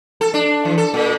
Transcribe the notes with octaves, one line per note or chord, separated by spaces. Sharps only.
A4
D4
E3
A4
A#2